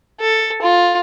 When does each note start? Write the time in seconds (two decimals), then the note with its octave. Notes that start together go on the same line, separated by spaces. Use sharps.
0.21 A4
0.62 F4